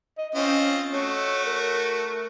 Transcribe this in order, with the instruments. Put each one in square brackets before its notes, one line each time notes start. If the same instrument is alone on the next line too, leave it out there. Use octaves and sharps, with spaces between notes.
[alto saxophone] D#5
[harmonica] C4 F4 D#5 [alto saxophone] C#4
[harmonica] A3 F#4 [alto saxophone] C#5
[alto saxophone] A#4